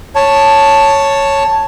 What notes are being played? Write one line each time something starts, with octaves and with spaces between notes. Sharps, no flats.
C#5 A5